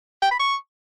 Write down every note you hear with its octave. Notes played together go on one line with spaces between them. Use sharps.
G5
B5
C#6